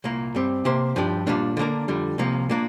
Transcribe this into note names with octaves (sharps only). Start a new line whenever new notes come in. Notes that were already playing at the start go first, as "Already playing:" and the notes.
C2 A#2 A#3
G2 G3 C4
C3 A#3 G4 C5
G2 F3 D4 G4
A#2 G3 A#3 D4
D3 A#3 D4 A#4
F2 D3 G3
C2 C3 F3 A#3
A#2 A#3 D4